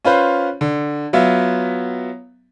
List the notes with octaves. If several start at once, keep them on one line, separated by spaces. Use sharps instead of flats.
C#4 F4 B4 C5
D3
F#3 B3 F4 E5